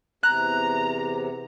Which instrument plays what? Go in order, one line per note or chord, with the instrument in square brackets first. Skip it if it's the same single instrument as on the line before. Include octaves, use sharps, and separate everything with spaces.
[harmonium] E2 C3 [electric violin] A#5 [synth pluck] F#6